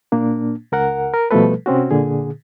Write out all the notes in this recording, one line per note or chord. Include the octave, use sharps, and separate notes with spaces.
A#2 A#3 D4
C#2 A#4 F#5
A#4
B2 F3 G3 A3 A4 B4
C3 C4 C#4 F#4
A#2 D3 G#4